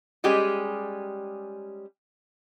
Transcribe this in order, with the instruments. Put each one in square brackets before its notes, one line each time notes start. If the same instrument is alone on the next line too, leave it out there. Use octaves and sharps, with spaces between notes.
[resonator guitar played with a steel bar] G3 G#3 C#4 G4 G#4